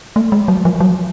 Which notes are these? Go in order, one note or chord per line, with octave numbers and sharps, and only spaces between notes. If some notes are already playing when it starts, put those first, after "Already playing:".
A3
G#3
F#3
F3
F#3